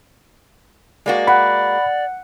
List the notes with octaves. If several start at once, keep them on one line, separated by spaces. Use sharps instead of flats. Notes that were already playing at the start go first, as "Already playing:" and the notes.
G#3 A#3 F#4 D5
F#5 B5